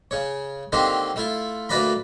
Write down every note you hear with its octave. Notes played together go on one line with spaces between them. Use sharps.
C#3 C#5
D3 D#3 A#3 C4 G4 C5
A3 E4 F4
D2 A#3 B4 D5 A#5 B5